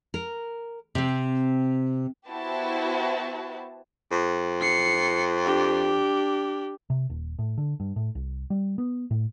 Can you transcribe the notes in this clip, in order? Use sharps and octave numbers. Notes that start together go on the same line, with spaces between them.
A#4
C3 C4
B3 E4 F#4 G4 C5 A5
F2
C7 C#7
D4 G4
C3
D#1
A2
D3
G2
A2
C2
G3
B3
A2